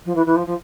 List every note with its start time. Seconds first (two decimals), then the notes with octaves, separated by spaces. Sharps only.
0.05 F3
0.15 E3
0.26 E3
0.36 F3
0.46 F3